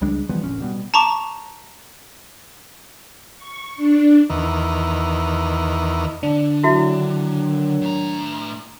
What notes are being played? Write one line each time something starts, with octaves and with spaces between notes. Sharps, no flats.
C#2 G3 G#3 D4
E3 F3 G3 B3
F1 A#1 A2 C#4
B2 G3 B3
A5 A#5 C#6 D6
C#6
D4
E2 D#3
D3 D4
D#3 F#3 E4 F#4 E5
A2 A#5